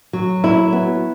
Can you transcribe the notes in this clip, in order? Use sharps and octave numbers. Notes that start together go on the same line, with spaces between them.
F#3
E4
B3